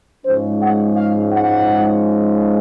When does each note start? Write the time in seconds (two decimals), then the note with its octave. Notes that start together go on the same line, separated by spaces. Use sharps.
0.24 G#2 F3 G#3 C#4 C5
0.60 F#5
0.96 F5
1.31 F#5